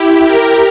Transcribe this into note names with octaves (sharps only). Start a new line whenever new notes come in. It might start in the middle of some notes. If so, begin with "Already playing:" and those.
Already playing: E4 G4
G4 A#4